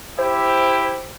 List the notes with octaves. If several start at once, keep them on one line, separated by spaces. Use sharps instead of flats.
E4 G4 C5